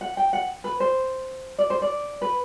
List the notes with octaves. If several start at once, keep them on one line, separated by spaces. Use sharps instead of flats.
F#5
G5
F#5
B4
C5
D5
C5
D5
B4